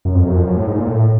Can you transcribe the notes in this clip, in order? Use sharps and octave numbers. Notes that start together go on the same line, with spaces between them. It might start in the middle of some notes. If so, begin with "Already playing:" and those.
F#2
F2
F#2
F2
F#2
A2
G#2
A#2
A2